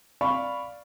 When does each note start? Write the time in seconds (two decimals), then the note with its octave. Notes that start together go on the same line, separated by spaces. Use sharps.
0.21 D5 F5 B5 C#6